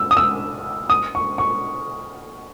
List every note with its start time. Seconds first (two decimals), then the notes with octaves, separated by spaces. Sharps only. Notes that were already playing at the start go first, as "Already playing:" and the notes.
Already playing: E6
0.11 D#6
0.17 E6
0.90 D#6
1.15 C#6
1.38 C#6